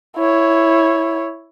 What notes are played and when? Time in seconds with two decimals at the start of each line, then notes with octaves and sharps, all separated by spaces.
0.17 E4 C#5